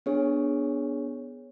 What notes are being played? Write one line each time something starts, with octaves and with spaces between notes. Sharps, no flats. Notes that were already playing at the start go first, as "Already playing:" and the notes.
B3 D4 G#4 C#5